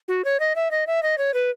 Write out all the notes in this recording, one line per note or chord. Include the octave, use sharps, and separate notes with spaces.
F#4
C#5
D#5
E5
D#5
E5
D#5
C#5
B4